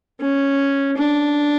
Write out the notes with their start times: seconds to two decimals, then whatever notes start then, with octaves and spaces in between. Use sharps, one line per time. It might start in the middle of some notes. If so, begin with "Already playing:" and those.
0.20 C#4
0.97 D4